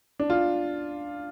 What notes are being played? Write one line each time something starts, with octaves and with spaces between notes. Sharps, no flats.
D4
F4